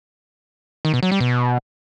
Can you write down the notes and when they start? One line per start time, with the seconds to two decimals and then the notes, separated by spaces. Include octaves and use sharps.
0.85 D#3
0.94 B2
1.03 F#3
1.12 G3
1.20 B2